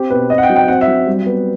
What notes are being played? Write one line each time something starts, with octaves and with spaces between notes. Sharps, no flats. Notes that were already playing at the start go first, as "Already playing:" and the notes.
Already playing: C4 G4
B2 B4
C4 D#5
F#5
G5
F#3
G5
C4 F#5
E5
F#3
G3
B3